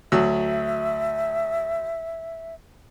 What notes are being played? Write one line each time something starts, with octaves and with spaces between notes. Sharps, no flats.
D2 F#3 E5 E6